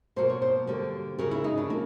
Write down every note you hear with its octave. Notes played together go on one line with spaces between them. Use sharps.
B2 F#3 A#3 C5
C#5
C5
D3 G3 A#3
C#3 F#3 A#3 A#4
E4
D#4
D4
A#3